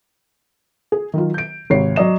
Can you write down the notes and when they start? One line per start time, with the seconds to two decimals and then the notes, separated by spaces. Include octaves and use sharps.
0.92 G#4
1.13 D#3 F#3 F4
1.34 G6 D7
1.70 G#1 C3 C#5 C7
1.96 F#3 D5 D#5 E7